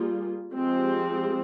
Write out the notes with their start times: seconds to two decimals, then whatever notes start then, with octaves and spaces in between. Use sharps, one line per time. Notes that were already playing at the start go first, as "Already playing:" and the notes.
Already playing: G3 A#3 F4 G#4
0.54 F3 G#3 C4 G4